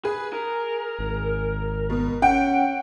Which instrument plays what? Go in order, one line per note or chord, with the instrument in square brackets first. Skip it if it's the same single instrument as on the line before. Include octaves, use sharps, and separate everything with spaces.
[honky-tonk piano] G#4 [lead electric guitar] B4
[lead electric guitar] A#4
[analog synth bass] G#1
[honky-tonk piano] B2
[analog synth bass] C#4 [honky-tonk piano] F#5 G5